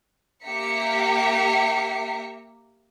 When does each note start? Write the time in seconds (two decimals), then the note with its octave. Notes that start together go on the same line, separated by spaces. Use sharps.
0.46 A#3 G4 E5 A#5 B6 C#7